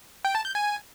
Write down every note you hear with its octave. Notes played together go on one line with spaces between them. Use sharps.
G5
A5
G6
G#5